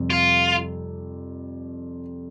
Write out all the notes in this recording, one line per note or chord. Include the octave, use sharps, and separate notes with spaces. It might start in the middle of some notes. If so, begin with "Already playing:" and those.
Already playing: F2 C3 G3
F4